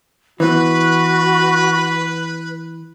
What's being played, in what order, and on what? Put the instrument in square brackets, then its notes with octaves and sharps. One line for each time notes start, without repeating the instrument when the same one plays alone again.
[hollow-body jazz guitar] E3 B3 [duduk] F#4 [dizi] B4